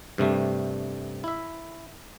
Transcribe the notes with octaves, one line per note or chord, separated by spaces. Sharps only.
G2 C3 G3 A3
E4 E5